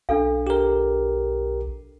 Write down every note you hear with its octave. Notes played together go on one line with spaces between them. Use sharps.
B1 D4 A4 F5
G4 A#4